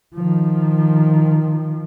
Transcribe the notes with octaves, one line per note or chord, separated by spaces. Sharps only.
D#3 F3